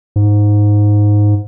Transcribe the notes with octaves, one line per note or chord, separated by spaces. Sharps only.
G#2